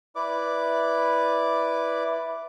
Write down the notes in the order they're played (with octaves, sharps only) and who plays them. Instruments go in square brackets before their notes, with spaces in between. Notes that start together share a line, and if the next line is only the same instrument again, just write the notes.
[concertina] E4 B4 D5 D6